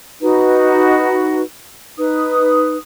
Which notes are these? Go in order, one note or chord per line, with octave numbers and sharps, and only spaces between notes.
D#4 F#4 B4
D#4 B4 D#6